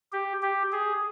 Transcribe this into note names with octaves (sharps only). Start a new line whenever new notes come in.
G4
G4
G#4